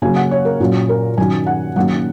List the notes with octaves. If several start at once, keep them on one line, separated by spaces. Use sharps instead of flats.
C#3 F#3 A#3 C#4 G#5
F#5
C#5
A#4
A#2 F#3 C#4
A#4
D#3 F#3 C#4 G#5
F#5
D#3 F#3 A#3 C#4 F#5